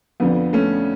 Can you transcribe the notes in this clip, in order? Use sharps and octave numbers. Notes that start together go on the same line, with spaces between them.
F2 D3 F3 B3
A3 C#4